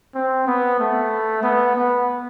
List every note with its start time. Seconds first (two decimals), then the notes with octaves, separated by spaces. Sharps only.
0.15 C4
0.47 B3
0.80 A3
1.43 B3
1.75 B3